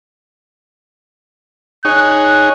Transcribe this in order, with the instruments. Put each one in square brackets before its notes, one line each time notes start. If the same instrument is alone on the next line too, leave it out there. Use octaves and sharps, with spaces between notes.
[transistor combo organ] D#4 G#4 C#5 [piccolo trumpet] F#6